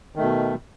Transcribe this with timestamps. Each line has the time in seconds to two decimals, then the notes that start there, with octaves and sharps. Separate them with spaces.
0.15 D#3
0.19 A3
0.22 B2